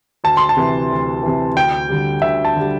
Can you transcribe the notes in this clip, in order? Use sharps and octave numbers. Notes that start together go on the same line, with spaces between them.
D2 A5
C6
A5
C3 E3
D2
C3 E3
D2 G5
D3 G3
D2 E5
A5
D3 G3